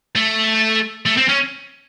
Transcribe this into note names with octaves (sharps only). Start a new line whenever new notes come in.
A3
A3
C4
C#4